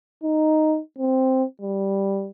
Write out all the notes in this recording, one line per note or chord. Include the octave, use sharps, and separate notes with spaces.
D#4
C4
G3